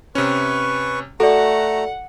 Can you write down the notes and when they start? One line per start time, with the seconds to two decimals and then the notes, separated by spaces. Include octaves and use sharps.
0.15 C3 C#4 B4 C#6
1.20 A3 F#4 A4 D5 F#5 A#5